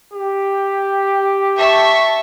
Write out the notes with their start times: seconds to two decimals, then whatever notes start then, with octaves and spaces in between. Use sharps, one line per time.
0.14 G4
1.58 E5 A5 C#6